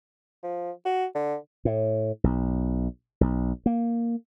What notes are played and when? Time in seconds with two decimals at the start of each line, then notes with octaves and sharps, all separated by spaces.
0.43 F3
0.85 F#4
1.15 D3
1.65 A2
2.24 B1
3.21 B1
3.66 A#3